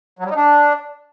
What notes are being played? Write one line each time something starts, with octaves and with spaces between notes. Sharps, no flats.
F#3
G3
D#4
D4